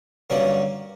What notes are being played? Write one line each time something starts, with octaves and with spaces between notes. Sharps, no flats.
G2 D3 F#3 A#3 C#4